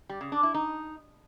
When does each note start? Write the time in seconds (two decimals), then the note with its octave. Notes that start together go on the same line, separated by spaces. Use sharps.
0.09 G3
0.21 C#3
0.32 D4
0.43 E4
0.54 D#4